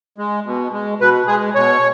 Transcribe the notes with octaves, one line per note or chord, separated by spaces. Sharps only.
G#3
B2
G#3
B2 B4
G#3 G#4
B2 C#5